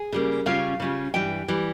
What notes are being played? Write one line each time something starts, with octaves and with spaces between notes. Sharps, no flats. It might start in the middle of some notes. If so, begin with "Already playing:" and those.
Already playing: G#4
C#3 G3 A#3
C#3 G3 C#4 F4 F5
C#3 G3 C#4 F4
G2 E3 G3 G5
E3 G3